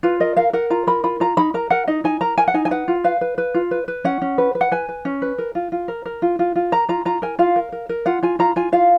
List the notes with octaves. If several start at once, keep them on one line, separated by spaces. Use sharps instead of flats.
F4 B4
A#4 D#5
A#4 F5
A#4 F#5
F4 A#5
A#4 B5
F4 B5
F4 A#5
D#4 B5
A#4 A#5
A#4 F#5
D#4 D#5
D#4 G#5
A#4 A#5
A#4 G#5
F#5
D#4 G#5
G#5
B4 F#5
F4
B4 F5
B4
B4
F4
B4
B4
C#4 F#5
C#4
B4
B4
F#5
B4 G#5
B4
C#4
B4
A#4
F4
F4
A#4
A#4
F4
F4
F4
A#4 A#5
F4 A#5
F4 A#5
A#4 G#5
F4 F5
A#4
A#4
A#4
F4 F#5
F4 G#5
F4 A#5
F4 G#5
F4 F5